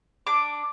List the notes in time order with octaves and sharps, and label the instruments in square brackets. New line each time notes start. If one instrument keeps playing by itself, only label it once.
[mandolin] D4 D6